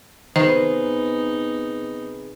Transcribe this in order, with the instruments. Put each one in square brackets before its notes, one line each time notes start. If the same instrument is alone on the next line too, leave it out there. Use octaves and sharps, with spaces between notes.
[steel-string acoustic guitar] C3 G#4 B4 [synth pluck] D#3 [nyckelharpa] B3 D#4 [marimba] C5